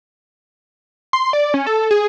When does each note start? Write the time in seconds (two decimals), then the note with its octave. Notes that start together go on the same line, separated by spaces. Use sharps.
1.13 C6
1.33 D5
1.54 C#4
1.67 A4
1.91 G#4